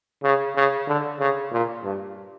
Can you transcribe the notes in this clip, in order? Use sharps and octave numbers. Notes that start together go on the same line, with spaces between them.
C#3
C#3
D3
C#3
A#2
G2